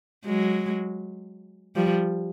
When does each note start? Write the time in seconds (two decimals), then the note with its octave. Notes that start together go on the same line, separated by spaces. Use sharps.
0.25 F#3 G#3
1.75 F3 G3